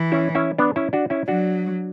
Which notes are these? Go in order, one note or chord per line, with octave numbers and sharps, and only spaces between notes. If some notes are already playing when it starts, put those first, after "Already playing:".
Already playing: E3
C#4 E4
C#4 E4
B3 D4
C#4 E4
D4 F#4
C#4 E4
F#3 D4 F#4